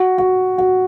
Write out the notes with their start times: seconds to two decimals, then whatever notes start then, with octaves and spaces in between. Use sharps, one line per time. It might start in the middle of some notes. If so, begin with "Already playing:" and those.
Already playing: F#4
0.18 F#4
0.58 F#4